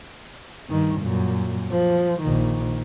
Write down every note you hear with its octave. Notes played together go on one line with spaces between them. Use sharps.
G2 D#3
F#2 A#2
F3
A#1 D#3